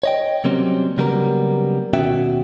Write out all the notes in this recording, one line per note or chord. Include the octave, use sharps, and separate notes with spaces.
C#5 D#5 G5
C3 F#3 G3 A#3 C4 C#4
C#3 F#3 G3 A#3 B3 A#4
D#2 B2 C#4 F#4 E5 G5